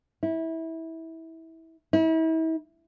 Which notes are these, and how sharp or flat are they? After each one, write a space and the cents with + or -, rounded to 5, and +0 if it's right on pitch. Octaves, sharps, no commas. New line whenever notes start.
E4 -20
E4 -40